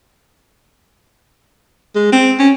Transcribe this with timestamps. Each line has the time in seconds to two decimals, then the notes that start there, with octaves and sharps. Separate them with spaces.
1.95 G#3
2.12 C4
2.39 C#4